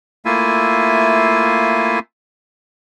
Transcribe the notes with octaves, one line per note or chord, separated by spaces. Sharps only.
A3 A#3 E4 F4 E5 G#5